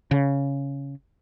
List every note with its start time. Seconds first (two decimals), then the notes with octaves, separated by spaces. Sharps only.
0.11 C#3